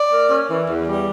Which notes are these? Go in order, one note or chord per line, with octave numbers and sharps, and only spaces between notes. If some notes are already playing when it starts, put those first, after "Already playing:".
Already playing: D5
A#3
C#4
E3
E2
G3